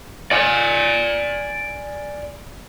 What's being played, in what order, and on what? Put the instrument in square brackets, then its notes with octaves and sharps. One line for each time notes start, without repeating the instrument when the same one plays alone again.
[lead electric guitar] D5 G#5